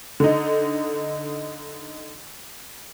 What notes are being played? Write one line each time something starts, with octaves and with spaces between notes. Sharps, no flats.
D3 D#4